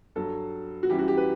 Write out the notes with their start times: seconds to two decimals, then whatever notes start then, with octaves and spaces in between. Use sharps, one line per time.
0.16 G2 F#3 A4
0.83 F#4
0.90 F#2 E3 G3 G4
0.99 F#4
1.08 G4
1.17 B4